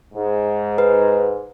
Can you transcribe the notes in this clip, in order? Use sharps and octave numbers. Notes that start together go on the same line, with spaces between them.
G#2
B4